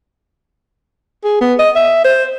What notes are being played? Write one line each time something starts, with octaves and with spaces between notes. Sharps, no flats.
G#4
B3
D#5
E5
C5